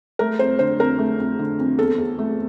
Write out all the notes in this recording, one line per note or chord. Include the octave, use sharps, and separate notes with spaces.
A3 A#4
F2 C5
D3 C5
F2 A#4
A3
F2
D3
F2
E2 A4
E2
A3